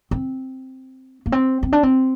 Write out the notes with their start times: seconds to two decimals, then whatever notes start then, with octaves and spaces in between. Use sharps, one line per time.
0.11 C4
1.26 A#3
1.32 C4
1.63 C4
1.72 D4
1.83 C4